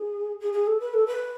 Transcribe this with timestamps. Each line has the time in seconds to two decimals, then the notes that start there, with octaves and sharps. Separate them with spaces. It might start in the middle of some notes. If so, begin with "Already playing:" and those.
Already playing: G#4
0.40 G#4
0.53 G#4
0.67 A4
0.80 B4
0.94 A4
1.07 B4